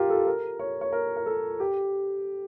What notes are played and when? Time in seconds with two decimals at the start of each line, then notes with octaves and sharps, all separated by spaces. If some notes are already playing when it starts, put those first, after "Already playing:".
Already playing: F4 G4 A#4
0.10 A4
0.26 A#4
0.59 C#5
0.81 C#5
0.92 A#4
1.16 A#4
1.26 A4
1.60 G4